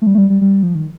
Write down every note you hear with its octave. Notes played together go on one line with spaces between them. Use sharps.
A3
G3
A3
G3
G3
G3
F3
D#3